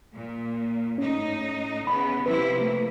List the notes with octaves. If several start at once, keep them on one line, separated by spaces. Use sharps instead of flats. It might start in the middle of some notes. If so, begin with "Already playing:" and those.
A#2
A2 C#4 D#4
C#3 B3 B5
C3 F3 E4 B4
A3 A#3